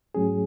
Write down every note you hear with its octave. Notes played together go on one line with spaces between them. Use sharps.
G#2 F#3 A3 C#4 G#4